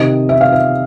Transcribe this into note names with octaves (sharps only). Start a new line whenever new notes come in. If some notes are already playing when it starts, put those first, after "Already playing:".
Already playing: C3 D#3 D#5
E5
F5
E5